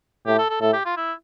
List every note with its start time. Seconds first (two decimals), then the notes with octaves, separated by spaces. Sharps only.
0.27 A2 G4
0.39 A4
0.50 A4
0.61 A2 A4
0.73 G4
0.85 F4
0.97 E4